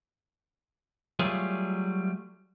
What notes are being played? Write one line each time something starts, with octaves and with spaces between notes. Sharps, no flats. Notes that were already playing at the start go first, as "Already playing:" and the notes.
F#3 G3 A3 F4 G#4